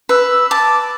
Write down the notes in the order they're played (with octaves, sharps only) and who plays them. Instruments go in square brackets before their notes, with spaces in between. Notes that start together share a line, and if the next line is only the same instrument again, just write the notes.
[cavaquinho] B4 [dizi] E6
[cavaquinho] A5 [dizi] D6